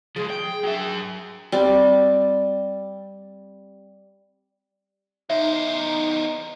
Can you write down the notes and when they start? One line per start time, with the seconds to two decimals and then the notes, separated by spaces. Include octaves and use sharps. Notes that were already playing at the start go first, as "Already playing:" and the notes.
0.16 F3 G#3 G#4
0.30 G5
0.64 F#3 E5
1.52 G3 C4 D5
5.30 E2 D#4 C5 E5